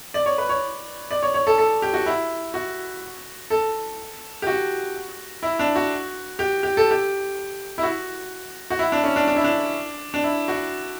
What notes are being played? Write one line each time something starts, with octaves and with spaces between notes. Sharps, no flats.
D5
C#5
B4
C#5
D5
C#5
C#5
A4
A4
G4
F#4
E4
F#4
A4
G4
F#4
E4
D4
F#4
G4
G4
A4
G4
E4
F#4
F#4
E4
D4
C#4
D4
D4
E4
D4
D4
E4
F#4